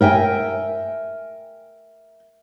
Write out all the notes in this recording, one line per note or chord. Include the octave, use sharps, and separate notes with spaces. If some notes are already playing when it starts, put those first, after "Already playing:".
A#4 E5 G5 G#5